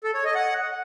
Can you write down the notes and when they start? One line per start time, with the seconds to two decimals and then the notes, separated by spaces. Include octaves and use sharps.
0.04 A4
0.14 C#5
0.25 D#5
0.35 F#5